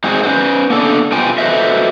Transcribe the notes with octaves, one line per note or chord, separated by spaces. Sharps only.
G#2 C4 D#4 F#4 G#4
C#4 B4 C5
A#3 B3 D4 A4
B2 B3 F4 C5 G5 G#5
F#4 A4 B4 C5 D#5 E5